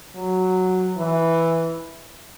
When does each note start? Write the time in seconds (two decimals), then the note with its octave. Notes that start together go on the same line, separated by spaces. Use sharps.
0.16 F#3
0.97 E3